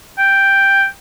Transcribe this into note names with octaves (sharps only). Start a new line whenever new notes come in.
G5